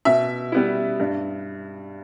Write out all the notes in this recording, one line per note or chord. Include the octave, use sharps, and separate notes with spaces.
B2 E5
G3 B3 E4
G2